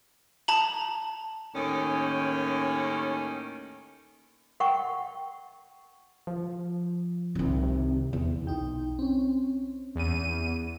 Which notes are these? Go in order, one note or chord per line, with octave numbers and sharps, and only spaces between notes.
A5 A#5 F#7
D#2 A2 D#3 C#4
A#4 F#5 G5 C#6
F3
C2 D#3
C3
E2 E3
B1 D#4 G5
C4 C#4
E2 D#7